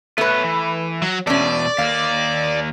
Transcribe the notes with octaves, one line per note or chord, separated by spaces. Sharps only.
A3 B3 B4 C#5
E3
F#3
E2 B2 A3 C#4 D5
D#2 A#3 F5